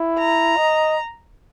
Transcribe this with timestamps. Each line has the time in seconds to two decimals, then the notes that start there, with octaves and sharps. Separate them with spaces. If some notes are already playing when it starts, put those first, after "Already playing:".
Already playing: E4
0.19 A#5
0.57 D#5